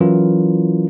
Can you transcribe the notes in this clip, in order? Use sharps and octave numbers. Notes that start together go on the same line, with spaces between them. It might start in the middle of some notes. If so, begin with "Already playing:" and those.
E3 F#3 C#4 E4 F4 A#4